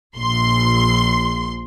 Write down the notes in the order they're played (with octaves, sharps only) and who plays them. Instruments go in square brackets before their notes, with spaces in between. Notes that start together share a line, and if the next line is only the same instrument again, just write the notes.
[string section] A#1 C6